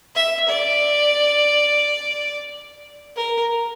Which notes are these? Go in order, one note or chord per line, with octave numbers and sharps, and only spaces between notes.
E5
D5
A#4